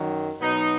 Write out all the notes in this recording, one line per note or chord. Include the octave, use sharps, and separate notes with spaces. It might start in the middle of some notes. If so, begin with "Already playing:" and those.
Already playing: F#2 D#3 F#3
B2 F#3 B3 D#4